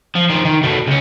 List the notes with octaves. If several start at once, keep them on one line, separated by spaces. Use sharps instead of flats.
F3
D#3 F3
D#3
B2 A3
C#2 C#4